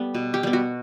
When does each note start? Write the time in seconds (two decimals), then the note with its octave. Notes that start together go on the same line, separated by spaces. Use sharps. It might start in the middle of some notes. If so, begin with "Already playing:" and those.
Already playing: G3 B3 A4
0.14 B2
0.34 G4
0.43 G3 B3
0.53 F#4